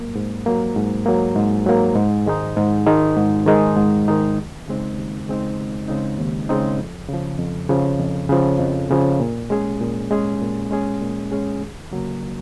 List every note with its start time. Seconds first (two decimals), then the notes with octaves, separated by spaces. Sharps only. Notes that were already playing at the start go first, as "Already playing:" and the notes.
Already playing: G#2 F#3 A#3
0.15 G#2
0.46 F#3 A#3
0.76 G#2
1.06 F#3 A#3
1.35 G#2
1.66 F#3 A#3
1.96 G#2
2.26 D#3 G#3 D#4
2.57 G#2
2.87 D#3 G#3 D#4
3.17 G#2
3.47 D#3 G#3 D#4
3.77 G#2
4.08 D#3 G#3 D#4
4.38 D#2
4.68 C#3 G#3 C4 D#4
4.98 D#2
5.28 C#3 G#3 C4 D#4
5.58 D#2
5.88 C#3 G#3 C4 D#4
6.18 D#2
6.49 C#3 G#3 C4 D#4
6.78 F2
7.09 C#3 F3
7.39 F2
7.69 C#3 F3
7.99 F2
8.29 C#3 F3
8.59 F2
8.90 C#3 F3
9.20 A#2
9.50 G#3 C#4 G#4
9.81 A#2
10.11 G#3 C#4 G#4
10.41 A#2
10.71 G#3 C#4 G#4
11.01 A#2
11.32 G#3 C#4 G#4
11.61 D#2
11.91 C#3 F#3 A#3